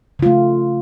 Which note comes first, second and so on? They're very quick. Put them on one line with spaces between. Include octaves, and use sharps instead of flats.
C#3 F4 A3